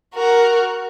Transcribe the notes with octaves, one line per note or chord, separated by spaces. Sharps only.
F#4 A#4